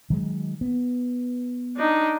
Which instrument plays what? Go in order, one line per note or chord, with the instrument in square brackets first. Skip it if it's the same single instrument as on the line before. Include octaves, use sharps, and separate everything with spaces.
[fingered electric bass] D#3 F#3 G#3
B3
[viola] D4 D#4